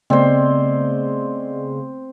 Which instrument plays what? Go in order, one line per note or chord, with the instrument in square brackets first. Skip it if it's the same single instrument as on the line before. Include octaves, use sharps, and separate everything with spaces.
[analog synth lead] C#3 [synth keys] A3 B3 [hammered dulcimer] C4 C5 [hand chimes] D5 D#5